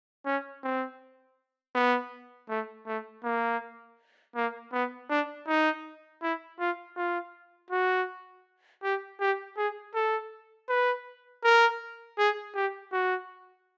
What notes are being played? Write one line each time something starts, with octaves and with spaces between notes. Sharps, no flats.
C#4
C4
B3
A3
A3
A#3
A#3
B3
D4
D#4
E4
F4
F4
F#4
G4
G4
G#4
A4
B4
A#4
G#4
G4
F#4